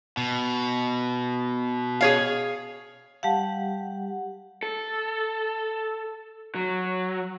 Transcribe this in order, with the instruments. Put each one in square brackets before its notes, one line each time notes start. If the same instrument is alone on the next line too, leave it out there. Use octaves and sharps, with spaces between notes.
[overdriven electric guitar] B2
[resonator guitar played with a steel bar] G#4 C#5 F5
[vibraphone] G3 G4 F#5 [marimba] F5 A5
[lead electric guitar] A4
F#3